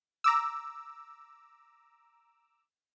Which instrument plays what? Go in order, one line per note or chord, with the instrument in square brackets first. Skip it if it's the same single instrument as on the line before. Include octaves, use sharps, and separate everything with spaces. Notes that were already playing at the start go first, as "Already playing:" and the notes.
[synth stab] A#5 D6 E6